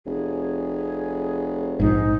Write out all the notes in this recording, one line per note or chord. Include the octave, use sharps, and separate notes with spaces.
F1 G#4
A#1 G#2 D#4